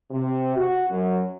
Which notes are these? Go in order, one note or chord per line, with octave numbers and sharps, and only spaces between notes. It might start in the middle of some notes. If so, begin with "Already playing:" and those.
C3
F#4
F#2